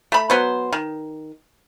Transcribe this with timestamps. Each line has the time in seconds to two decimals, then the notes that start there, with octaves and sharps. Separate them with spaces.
0.12 A3 B5
0.30 F#3 B3 C5
0.72 D#3